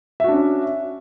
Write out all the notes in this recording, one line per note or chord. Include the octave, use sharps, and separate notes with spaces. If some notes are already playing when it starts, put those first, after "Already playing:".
C#4 D4 F#4 E5